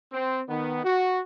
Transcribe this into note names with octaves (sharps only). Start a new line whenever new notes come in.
C4
D#3 B3
F#4